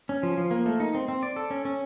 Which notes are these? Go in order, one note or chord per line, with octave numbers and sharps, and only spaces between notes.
C#4
F3
F3
A#3
A3
D#4
C4
C4
D5
A4
C#4
C#4